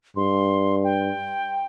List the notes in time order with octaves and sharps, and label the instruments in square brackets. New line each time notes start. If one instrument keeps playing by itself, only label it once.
[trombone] G2 [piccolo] C6
[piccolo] G5